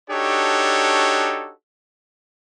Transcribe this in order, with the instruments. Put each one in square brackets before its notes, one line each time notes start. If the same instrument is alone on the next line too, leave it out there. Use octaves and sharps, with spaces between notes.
[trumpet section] D4 D#4 F#4 G4 A4 C#5